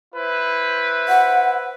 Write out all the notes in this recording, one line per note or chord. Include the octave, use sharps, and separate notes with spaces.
E4 B4 C5
F#5